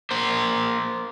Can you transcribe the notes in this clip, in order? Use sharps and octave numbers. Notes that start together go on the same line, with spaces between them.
A#3 C5